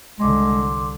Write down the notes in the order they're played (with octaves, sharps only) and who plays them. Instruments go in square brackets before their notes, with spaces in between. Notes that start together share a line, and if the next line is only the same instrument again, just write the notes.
[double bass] C2 D3 [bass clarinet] G#3 [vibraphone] C6 D6